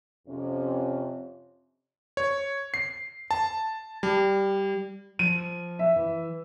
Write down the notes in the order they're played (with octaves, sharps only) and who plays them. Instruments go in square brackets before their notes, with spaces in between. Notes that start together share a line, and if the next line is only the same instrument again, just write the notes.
[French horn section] F2 C3 C#4
[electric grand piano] C#5
C7
A5
G3
[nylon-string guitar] F3 [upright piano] D#7
[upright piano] E5
[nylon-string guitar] E3